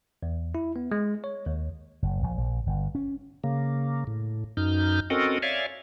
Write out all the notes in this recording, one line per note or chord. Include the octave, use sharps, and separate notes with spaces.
E2
E4
B3
G#3
C#5
D#2
F#1
A#1
A#1
G1
C#4
C#3 A#3
A2
F#2 D#4 F6 G6
C4 C#4 F#4 A4 A#4 D#5
C#5 D5 E5 F5 G#5